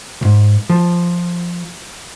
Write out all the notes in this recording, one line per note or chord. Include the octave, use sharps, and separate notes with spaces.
C2 G#2
F3